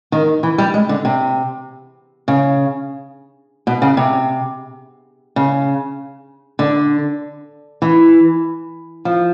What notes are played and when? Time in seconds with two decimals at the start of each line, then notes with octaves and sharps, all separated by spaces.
0.12 D#3
0.43 E3
0.58 G3
0.74 G#3
0.89 D3
1.05 C3
2.28 C#3
3.67 B2
3.82 C#3
3.97 C3
5.36 C#3
6.59 D3
7.82 E3
9.05 F3